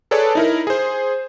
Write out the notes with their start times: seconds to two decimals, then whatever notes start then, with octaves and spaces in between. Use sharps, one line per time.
0.11 G#4 A4 B4 C#5 D5 A5
0.35 D#4 E4 A#4
0.67 G#4 C5